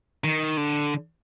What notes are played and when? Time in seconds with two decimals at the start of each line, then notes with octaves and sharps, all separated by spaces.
0.24 D#3
0.57 D3